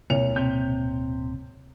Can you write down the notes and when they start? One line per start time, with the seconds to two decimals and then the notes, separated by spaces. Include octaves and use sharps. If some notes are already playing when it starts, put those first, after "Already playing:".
0.10 D1 C2 B2 A#3 C#5 F7
0.36 C3 G6